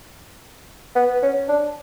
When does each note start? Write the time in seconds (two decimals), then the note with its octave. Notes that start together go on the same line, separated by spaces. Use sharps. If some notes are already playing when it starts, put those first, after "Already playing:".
0.96 B3
1.23 C#4
1.49 D4